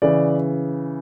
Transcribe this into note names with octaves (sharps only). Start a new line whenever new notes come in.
C#3 E3 D5